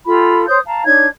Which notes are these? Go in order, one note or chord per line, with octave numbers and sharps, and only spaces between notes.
F4 G4 A4 B5
C5 C#5 D#6 G6
F5 A5 A#5
D4 D#4 C#5 G#6